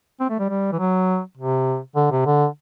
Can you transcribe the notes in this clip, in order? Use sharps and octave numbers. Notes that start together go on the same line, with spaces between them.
C4
A3
G3
G3
E3
F#3
C3
D3
C3
D3